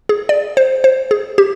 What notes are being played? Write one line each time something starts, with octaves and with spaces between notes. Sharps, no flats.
G#4
D5
C5
C5
G#4
G4